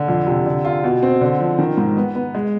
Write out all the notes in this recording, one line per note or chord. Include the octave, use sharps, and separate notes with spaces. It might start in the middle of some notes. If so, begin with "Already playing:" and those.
Already playing: D3
F2
C3
D3
F4
B2
C4
D3
F3
D#3
G#2
B3
B3
G#3